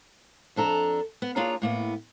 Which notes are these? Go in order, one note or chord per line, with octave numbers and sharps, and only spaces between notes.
F2 D4 A4 A#5
B3
A#3 D4 F4 G#4 C#5 A#5
A2 A#3 B3